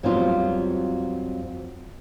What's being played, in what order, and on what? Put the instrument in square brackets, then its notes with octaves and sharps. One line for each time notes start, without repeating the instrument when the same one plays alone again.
[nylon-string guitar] F2 F#3 G3 B3 C4 F4